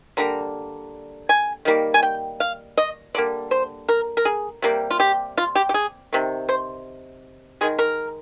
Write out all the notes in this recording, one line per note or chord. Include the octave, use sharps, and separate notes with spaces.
D3 G3 A#3 A#5
G#5
D#3 G3 A#3
G#5
G5
F5
D#5
D3 G3 A#3 D5
C5
A#4
A#4
G#4
C3 G3 A#3
F4
G4
F4
G4
G4
G#4
C3 D#3
C5
D#3 G#3 G#4
A#4